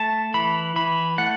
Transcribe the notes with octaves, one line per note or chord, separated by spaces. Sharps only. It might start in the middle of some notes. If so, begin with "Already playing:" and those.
Already playing: A3 A5
E3 B5
E3 B5
A3 F#5